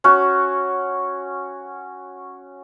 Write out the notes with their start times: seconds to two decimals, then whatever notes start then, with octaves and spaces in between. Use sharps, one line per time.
0.04 C#4 F#4